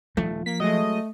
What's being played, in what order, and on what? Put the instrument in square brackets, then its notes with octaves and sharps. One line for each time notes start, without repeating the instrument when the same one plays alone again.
[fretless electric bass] D#1 A3 [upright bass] F3
[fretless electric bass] A#3 [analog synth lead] B6
[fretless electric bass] F#3 G#3 [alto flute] A3 [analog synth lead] D#5